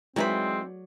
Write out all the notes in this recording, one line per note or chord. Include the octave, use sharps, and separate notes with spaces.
D#3 E3 F#3 G#3 C4 D5 B5